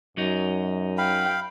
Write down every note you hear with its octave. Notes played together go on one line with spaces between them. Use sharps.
F#2 F#3 D#4
F5 G5 B5